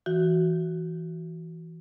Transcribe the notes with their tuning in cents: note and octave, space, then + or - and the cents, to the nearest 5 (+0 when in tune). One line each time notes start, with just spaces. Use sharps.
E3 +0 F#4 +0